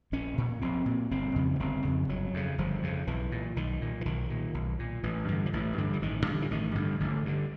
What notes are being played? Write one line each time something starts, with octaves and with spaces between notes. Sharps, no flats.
A#1 C#4
A#2
A#1 C4
A#2
G1 C4
F2 C#3
B3
G1 C4
F2 C#3
G1 F#3
F2 C#3
G1 F3
F2 C#3
B1 E3
A#2
B1 D#3
A#2
E3
B1 D#3
A#2
B1
A#2
A1 E3
G2 D3
F3
A1 E3
G2 D3
E3
A1 D#3
G2 D3
E3
A1 D#3
G2 D3
A1 D3
G2 D3